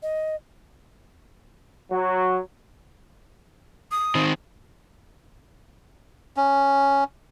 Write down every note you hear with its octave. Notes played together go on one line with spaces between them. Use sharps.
D#5
F#3
D#6
D#3 C4
C#4